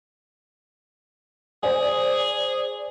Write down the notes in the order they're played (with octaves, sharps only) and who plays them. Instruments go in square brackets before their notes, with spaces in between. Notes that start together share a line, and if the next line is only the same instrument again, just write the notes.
[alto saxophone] G#4 [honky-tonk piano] C5 D5 G#5